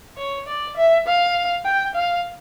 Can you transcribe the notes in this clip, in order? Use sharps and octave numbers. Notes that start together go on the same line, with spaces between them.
C#5
D5
E5
F5
G5
F5